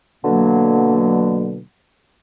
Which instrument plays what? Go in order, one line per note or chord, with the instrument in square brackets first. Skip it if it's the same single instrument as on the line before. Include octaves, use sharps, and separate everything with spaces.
[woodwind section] B2 D3 F#3 A#3